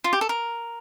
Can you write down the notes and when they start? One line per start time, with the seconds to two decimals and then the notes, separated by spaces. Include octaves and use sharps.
0.04 F4
0.13 G4
0.21 A4
0.29 A#4